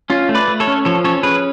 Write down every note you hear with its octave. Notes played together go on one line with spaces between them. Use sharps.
C#4 F4
A3
B4 D5
A3
A4 C#5
C#4
F3 A4 C#5
C#4 A4 C#5
C#4 G#4 B4